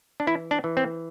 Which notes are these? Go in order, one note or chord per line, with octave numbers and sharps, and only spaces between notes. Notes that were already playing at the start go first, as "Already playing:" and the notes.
D4
E3 E4
D4
E3
C4